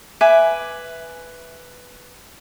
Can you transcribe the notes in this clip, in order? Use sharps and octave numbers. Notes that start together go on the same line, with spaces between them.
B4 E5 G#5 D6